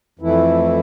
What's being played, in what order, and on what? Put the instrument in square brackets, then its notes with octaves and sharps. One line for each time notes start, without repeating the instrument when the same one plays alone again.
[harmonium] F2 E3 A3 E4